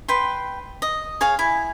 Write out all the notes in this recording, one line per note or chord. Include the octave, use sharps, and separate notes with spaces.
B4 G5 C6
D#5
G#4 C#5 F5
E4 G#5